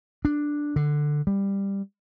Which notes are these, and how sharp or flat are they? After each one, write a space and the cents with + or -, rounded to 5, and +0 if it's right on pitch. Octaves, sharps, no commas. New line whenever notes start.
D4 +0
D3 +10
G3 +10